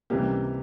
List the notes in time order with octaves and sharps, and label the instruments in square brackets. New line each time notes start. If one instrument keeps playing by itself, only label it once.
[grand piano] C#2 C3 E3 G3 A#3 G4